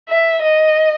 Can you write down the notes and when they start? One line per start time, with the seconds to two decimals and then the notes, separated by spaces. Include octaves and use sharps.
0.09 E5
0.43 D#5